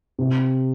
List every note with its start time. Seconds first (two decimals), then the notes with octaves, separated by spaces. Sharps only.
0.19 C3